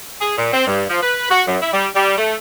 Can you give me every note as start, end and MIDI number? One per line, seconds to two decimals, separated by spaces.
0.21 0.35 68
0.38 0.49 46
0.53 0.65 60
0.67 0.85 43
0.90 1.02 53
1.02 1.30 71
1.30 1.43 66
1.47 1.57 42
1.62 1.70 64
1.73 1.87 55
1.95 2.16 55
2.18 2.35 57